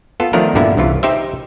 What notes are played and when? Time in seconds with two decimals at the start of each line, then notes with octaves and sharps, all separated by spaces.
0.20 B3 F4 A4
0.33 D#3 F3 A3 B3 D4 A#4
0.55 G2 A#2 D3 A#3 B3 E4
0.77 C2 C#3 E3 F4
1.03 D#4 G4 C5 E5